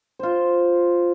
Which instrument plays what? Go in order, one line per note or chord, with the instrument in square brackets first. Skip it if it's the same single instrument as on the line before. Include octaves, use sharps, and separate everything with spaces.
[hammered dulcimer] F4 C5